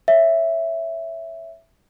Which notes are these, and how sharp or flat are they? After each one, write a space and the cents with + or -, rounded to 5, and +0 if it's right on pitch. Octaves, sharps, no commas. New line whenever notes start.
C#5 +0 E5 +5